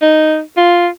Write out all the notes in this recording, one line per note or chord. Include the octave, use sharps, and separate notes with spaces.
D#4
F4